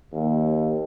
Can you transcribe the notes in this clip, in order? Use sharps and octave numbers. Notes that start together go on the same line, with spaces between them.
D#2